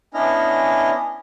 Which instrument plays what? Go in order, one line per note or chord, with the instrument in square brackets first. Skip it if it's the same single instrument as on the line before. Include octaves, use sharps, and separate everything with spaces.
[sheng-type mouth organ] B3 C#4 D4 E4 D#5 F6